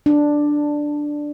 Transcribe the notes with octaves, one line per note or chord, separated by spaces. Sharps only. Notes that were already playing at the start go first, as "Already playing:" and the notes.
D4